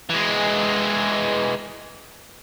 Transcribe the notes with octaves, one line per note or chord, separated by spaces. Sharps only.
E3 G#3